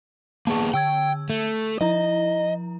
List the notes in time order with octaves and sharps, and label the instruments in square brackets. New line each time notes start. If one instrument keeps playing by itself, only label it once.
[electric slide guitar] A#3 B3 G#4 [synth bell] A5 C#6
[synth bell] D3 E6 G#6 [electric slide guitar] G5
[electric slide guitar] A3
[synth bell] F3 E4 A#5 [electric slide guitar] D#5